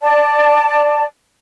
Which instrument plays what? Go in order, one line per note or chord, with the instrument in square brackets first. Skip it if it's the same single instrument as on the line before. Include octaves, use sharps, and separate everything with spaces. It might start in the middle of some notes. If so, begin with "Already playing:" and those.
[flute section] D5 A5